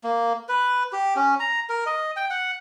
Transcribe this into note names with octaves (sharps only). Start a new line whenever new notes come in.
A#3
B4
G4
C#4
A#5
A#4
D#5
G5
F#5